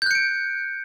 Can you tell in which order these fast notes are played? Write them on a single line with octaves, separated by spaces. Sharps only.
G6 F#6 C#7 D7